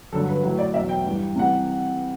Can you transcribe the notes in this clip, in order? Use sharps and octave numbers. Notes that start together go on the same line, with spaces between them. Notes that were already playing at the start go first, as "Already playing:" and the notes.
G2 D3 F#3 A4
B4
A2 F#3 B4
D5
E2 B2 F#3 E5
G5
G2 E3 G3
C3 E3 G3 F#5